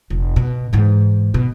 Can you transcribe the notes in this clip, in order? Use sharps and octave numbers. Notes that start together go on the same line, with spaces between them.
F1
B2
G#2 E3
B2